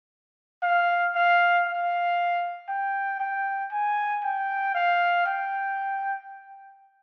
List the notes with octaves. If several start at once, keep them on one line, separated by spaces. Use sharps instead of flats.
F5
F5
F5
G5
G5
G#5
G5
F5
G5